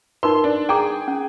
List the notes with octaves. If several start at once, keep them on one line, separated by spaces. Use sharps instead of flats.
D#4 A#4 B4 C6
D4
G#4 G5 A#5 D6
C#4